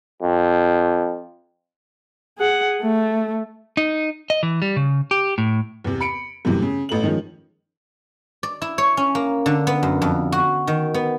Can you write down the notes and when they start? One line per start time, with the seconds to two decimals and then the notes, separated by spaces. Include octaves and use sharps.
0.22 F2
2.38 G#4 F#5
2.82 A3
3.77 D#4
4.30 D#5
4.43 E3
4.62 G3
4.76 C#3
5.11 G4
5.38 A2
5.84 E2 C3
6.00 B5 C#7 D7
6.45 F#2 A2 C3 E3
6.62 C#3
6.89 A1 A3 F#7
7.03 D#3 F3 G#3 C#4
8.43 D5
8.62 E4
8.78 C#5
8.97 C#4
9.15 A#3
9.46 D3
9.67 B3
9.83 F#2
10.02 F2
10.32 F#4
10.67 D#3
10.94 B3